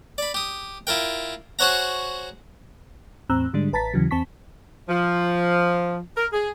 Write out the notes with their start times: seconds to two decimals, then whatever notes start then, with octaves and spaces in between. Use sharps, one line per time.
0.18 D5 B5
0.34 G4 D#6
0.87 E4 F4 A#4 G5
1.59 F#4 G#4 C5 C#5 F#5 A#5
3.30 E2 A2 C4 A#5 E6 F#6
3.53 G#2 D3 G3 G#3 D4
3.73 A1 B4 A5 A#5 A6 B6
3.94 D#2 C#3 E3 F#3
4.11 E2 C4 A5 C#6 B6
4.89 F3
6.16 A#4
6.32 G#4